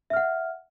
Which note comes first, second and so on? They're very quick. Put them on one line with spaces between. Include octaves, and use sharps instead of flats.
E5 F6 F#5